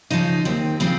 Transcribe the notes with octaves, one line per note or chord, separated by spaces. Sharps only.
C#3 F3 D#4
D#2 C4
C#3 F3 C4